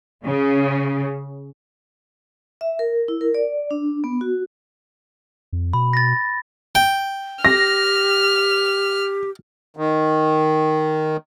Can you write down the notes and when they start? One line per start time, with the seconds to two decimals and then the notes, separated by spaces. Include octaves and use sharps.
0.24 C#3
2.61 E5
2.79 A#4
3.08 E4
3.21 A#4
3.35 D5
3.71 D4
4.04 B3
4.21 F#4
5.53 F2
5.73 B2 B5
5.93 A6 A#6
6.75 G5
7.45 G4 F6 A#6
9.77 D#3